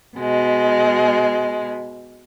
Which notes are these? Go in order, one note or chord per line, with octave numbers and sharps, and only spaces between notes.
B2 G#3